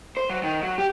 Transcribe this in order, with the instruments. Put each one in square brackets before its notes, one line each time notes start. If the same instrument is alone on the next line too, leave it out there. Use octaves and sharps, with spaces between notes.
[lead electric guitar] C5
F#3
D#3
F#3
G4